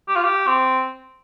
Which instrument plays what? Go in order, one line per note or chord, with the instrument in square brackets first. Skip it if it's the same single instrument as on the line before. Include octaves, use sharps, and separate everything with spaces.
[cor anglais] G4
F4
G4
C4